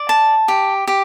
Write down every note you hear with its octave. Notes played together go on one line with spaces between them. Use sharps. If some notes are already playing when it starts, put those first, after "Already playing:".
Already playing: D5
A5
G4
G4